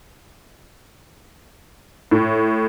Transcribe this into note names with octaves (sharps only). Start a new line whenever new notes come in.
A2